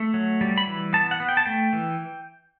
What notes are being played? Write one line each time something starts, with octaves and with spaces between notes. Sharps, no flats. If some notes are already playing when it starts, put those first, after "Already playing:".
Already playing: A3
F#3
G3
B5
E3
B3 A5
F#5
B3
G5
A5
A3 G5
E3